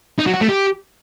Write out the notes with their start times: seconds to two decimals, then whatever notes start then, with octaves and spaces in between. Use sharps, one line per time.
0.19 D#4
0.26 F#3
0.34 F#4
0.41 A3
0.49 G4